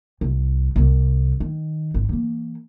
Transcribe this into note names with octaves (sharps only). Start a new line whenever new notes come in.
C2
C2 C3
D#3
G#1
E3 A#3